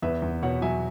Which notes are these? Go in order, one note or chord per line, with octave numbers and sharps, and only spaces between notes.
E2 B4 E5
E2
B2 C#5 F#5
F#3 E5 G#5